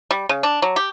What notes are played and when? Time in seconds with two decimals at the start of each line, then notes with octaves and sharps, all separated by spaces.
0.11 G3
0.29 C#3
0.43 D4
0.62 F#3
0.76 G4